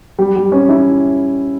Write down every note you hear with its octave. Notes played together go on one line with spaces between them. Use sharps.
G3
G3
C#4
E4